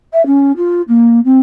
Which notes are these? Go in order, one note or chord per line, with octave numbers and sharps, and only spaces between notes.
E5
C#4
F4
A#3
C4